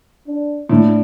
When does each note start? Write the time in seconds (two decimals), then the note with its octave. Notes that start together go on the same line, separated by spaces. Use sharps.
0.27 D4
0.69 A2 D4